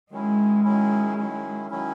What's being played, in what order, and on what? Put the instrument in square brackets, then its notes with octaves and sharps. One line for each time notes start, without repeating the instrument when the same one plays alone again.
[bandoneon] D#3 F#3 C#4 E4 [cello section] G#3
[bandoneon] D#3 F#3 C#4 E4
D#3 F#3 C#4 E4
D#3 F#3 C#4 E4